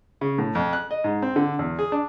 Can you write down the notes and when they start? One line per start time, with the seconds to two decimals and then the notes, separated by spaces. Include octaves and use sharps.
0.21 C#3
0.38 A2
0.55 F2
0.73 F#6
0.91 D#5
1.04 G#2
1.22 C4
1.36 D3
1.59 E2
1.79 G#4
1.92 D4